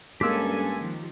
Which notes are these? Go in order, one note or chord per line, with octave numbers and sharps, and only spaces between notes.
G2 G#3 A#3 C#4 G4 A4 G#5 E6
D#3 F3